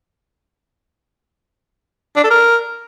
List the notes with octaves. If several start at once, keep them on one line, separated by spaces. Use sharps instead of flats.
D4
A4
A#4